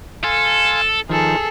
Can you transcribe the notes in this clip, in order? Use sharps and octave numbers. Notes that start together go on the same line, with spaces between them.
A4 F5 G#5 C6
D#3 F3 G#4 A4